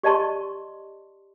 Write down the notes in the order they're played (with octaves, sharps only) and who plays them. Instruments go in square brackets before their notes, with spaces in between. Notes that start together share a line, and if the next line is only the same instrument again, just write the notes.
[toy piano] G4 D5 D#5 A5 C6 C#6